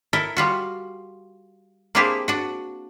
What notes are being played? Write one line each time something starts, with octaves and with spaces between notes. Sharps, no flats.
E4 A4 A#4
G3 F4 F#4
A#3 C4 D4 E4 G4 G#4
D4 F#4